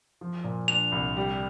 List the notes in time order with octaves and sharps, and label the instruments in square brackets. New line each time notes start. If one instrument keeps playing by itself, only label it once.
[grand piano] F3
A#2
[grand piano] D4 [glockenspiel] F7
[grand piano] C2
G3